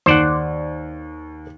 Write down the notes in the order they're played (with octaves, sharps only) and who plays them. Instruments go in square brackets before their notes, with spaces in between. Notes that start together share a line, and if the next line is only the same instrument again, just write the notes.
[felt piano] D#2 [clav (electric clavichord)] C5 D5 F#5